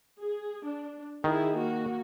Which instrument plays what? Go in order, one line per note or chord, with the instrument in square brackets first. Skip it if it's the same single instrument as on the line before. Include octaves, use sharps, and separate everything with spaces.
[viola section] G#4
D4
[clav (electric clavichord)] D#3 [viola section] E4 G#4
[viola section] A#3 F#4